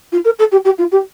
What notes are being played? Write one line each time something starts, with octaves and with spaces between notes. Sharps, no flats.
F4
A#4
A4
G4
G4
F4
G4